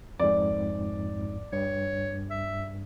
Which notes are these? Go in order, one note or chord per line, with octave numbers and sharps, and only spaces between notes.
F2 G#2 D5
G2 C#5
E5